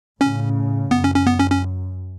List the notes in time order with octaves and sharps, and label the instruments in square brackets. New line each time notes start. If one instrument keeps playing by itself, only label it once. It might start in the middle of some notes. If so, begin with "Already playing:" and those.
[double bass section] A2 C#3 [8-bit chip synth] C#4
[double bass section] F#2 [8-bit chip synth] B3
[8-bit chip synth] C#4
C#4
B3
C#4
C#4